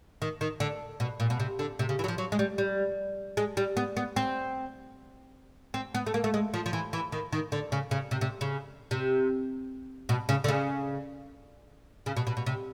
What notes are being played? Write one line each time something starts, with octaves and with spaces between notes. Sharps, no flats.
D#3
D#3
D3
B2
A#2
B2
C3
D3
C3
C#3
E3
F#3
F3
F#3
G#3
G3
G3
G#3
G3
B3
B3
C4
C4
B3
A3
A#3
A3
G#3
F3
F3
E3
E3
D#3
D#3
D3
C#3
C#3
C3
C3
C#3
C3
B2
C#3
D3
C#3
C#3
B2
B2
B2
C3